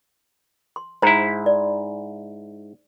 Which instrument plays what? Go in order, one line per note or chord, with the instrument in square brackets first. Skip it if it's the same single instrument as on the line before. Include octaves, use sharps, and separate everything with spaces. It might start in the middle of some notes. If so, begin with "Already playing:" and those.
[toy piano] C6
[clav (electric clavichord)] G#2 E4 [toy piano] C5 A#5
[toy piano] D5